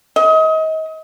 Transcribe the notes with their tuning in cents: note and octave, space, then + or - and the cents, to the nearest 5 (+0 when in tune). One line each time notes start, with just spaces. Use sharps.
D#5 +30